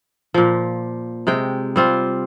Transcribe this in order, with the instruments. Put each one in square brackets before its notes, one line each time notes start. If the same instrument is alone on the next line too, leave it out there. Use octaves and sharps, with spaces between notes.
[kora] A#2 F3
C3 G#3 G5
G3 C4 F4